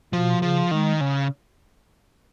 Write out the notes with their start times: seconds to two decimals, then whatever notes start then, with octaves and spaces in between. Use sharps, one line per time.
0.13 B2 F3
0.42 C#3 F3
0.71 D#3 G#3
1.01 C#3